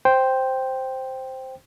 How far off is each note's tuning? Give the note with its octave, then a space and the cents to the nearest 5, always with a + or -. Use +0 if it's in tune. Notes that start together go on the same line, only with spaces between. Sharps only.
C5 +0 G5 +0